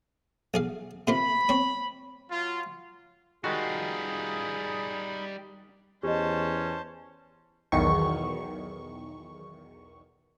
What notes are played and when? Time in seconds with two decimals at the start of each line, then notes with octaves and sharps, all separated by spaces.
0.54 B1 G#4 F5
1.07 C3 A#3 F4 B5
1.49 C4 C#5
2.29 F#3 F4
3.44 D#3 G3 G#3 D#4 F4 F#4 G#4 B5
6.03 E2 C#4 G4 C5 D#5 A5
7.72 B1 E2 D#3 C#6